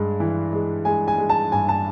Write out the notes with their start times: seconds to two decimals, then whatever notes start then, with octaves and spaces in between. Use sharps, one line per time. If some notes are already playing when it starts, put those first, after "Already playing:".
Already playing: G2 G#3
0.20 E3
0.53 G#3
0.85 G#3 G#5
1.08 G#5
1.18 G#3
1.29 A5
1.52 G2 G#5
1.69 A5